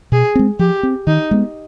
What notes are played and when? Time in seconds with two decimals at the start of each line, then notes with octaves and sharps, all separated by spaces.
0.12 B2 G#4
0.35 G#3 C4
0.59 F3 G4
0.83 C4
1.07 D#3 D#4
1.31 G#3 B3